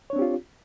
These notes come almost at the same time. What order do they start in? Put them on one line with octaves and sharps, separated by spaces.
C#5 D4 C4 G4 F4